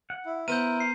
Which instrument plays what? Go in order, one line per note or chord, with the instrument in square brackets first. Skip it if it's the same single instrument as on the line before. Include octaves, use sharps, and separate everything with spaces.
[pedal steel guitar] F#5
[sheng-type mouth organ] E4
[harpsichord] B3 C5 F#5 [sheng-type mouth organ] E4 [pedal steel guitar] A#4 [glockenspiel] G6 D#7
[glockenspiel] C7